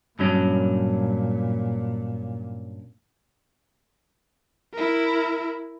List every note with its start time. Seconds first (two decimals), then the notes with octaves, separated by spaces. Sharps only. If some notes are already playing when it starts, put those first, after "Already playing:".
0.19 G2 A#2 F#3 C#4
4.73 E4 A#4